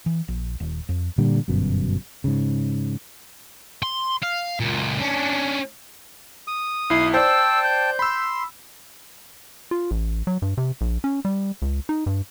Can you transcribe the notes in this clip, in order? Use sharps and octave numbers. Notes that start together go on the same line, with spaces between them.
E3
A#1
D#1
F2
A#2 D3 G3
G1 F#2 B2
G#2 C#3
C6
F5
C#2 A#2
C#4 D4
D#6
B1 E4 C7
C5 D5 G5 A5 E6
G6
B5 C6 E6
F4
A1
F#3
G2
C3
A#1
C#4
G3
C#2
D#4
G2